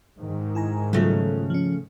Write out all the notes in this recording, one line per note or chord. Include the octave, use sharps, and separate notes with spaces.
G#2 D#3
E4 G#5 A#5
C#3 F#3 G3 A3 F4
F3 C#4